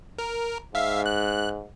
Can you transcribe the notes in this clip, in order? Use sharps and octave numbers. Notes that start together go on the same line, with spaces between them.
A#4
G#2 E5 F5
F#6